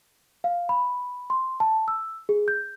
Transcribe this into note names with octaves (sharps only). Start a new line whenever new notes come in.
F5
B5
C6
A5
E6
G#4
G6